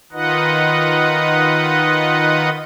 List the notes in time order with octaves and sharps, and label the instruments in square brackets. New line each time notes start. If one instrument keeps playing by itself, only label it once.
[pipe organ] D#3 D#4 F4 B4 D#5 F#5